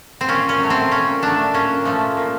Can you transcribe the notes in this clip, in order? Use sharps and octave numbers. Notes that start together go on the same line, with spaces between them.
C4
A#2 C#4
C#4
F#3 A3
C4
A#2 C#4
F#3 A3 D4
A#2 C#4
F3 A3
A#2